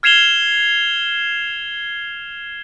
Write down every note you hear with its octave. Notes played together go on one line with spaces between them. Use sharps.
F6 G#6 C7 E7 F7 G7